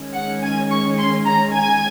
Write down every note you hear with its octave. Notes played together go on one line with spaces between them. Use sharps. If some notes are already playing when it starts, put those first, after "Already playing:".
Already playing: D#3 G#3 C#4
F#5
G#5
C#6
C6
A#5
G#5